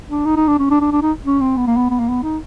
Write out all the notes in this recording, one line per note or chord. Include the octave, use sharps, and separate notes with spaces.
D4
D#4
D#4
D4
C#4
D4
D4
D4
D#4
C#4
C4
B3
A#3
B3
B3
A#3
B3
D#4